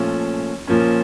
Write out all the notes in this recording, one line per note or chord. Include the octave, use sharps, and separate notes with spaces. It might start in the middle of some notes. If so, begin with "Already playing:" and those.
Already playing: A#2 F3 A3 C#4
A#2 F3 A#3 C#4